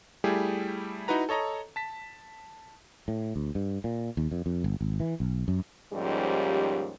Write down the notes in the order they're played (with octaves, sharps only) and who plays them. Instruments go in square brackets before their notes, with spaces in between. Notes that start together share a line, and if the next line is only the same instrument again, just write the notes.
[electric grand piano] G3 A3 E4 G4 G#4
D#4 E4 F#4 B4 A#5
A4 C#5 D#5 A#5
A5 B6
[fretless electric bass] A2
D2
G2
A#2
D#2
F2
F2
G1
G#1
E3
B1
F#2
[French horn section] D#2 G#2 F3 G3 C#4 G4